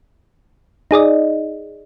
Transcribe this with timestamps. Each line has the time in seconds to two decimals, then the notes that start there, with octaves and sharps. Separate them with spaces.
0.91 D#4 G#4 D5 D#5